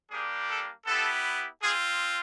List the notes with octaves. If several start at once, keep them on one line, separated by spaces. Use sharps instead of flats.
G3 A#3 D4 G4 G#4
A4
B3 E4 G4 A4
C4 F4 G#4